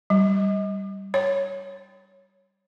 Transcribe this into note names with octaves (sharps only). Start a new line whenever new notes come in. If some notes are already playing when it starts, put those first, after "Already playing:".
G3
C#5